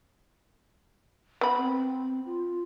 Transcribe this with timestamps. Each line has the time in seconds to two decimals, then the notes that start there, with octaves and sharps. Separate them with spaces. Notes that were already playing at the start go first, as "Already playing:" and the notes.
1.41 B3 B5
1.58 C4
2.26 F4